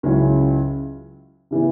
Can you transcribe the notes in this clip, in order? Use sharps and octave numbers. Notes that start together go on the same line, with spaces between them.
C#2 C#3 F#3 C#4 E4
C#3 E3 B3 E4